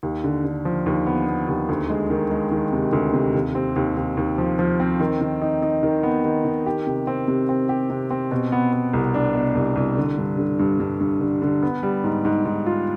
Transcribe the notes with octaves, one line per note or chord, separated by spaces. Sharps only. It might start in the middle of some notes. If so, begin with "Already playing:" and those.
D#2
D3
D3
F3
D#2
B3
B3
D#2
D2
G#3
D#3
G#3
D#3
C3
D2
C3
D#2
C4
D#2
D#2
D#2
F3
F3
C4
D#3
D#3
D#4
D#4
D#3
B3
D#3
D#3
G4
C3
C4
C3
C4
G4
C3
C4
B2
B3
B3
C2
D4
B2
C2
C2
D3
G2
D3
G2
G2
G2
D3
D3
B3
G3
G#2
G#2
G#2
F4